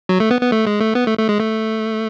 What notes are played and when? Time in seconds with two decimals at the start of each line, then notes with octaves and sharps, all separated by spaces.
0.09 F#3
0.20 A3
0.31 B3
0.41 B3
0.52 A3
0.67 G#3
0.81 A3
0.95 B3
1.07 A3
1.18 A3
1.29 G#3
1.40 A3